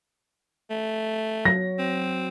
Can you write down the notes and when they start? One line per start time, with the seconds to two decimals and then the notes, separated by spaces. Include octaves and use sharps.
0.70 A3
1.45 F#3 A#6
1.79 C4